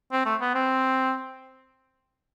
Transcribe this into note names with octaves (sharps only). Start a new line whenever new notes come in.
C4
A3
B3
C4